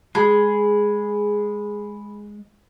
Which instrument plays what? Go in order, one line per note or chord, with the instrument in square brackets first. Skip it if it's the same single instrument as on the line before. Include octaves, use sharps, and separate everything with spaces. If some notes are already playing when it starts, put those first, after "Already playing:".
[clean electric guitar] G#3 [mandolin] G#4 [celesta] B5